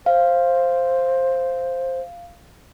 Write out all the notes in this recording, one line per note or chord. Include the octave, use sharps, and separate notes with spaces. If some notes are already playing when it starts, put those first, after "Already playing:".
C5 F5